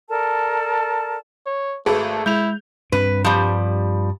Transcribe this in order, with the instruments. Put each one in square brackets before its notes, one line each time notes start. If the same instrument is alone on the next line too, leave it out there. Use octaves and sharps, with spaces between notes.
[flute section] A4 A#4 D5 A5
[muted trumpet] C#5
[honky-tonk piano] G#1 A4 B4 [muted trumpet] A3 [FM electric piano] F#4 [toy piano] G#4
[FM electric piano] G#3 [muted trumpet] E4 [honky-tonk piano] G6 F7
[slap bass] G2 C4 D4 [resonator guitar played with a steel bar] B4
[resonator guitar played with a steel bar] F3 G3